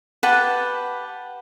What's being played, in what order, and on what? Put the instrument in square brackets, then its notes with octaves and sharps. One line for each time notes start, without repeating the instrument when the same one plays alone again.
[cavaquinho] G4 B4 F#5 A5